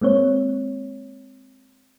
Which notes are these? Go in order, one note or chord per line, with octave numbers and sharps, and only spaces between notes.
G#3 A#3 C4 C#5